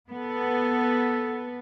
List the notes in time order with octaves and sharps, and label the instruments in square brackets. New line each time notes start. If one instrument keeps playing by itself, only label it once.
[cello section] B3 [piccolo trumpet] A4